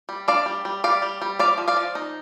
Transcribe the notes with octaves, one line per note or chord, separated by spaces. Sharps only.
G3
D4 D5 F5
G3
G3
G3 D5 F5
G3
G3
F3 D5 F5
F3
D5 F5
F3
D#4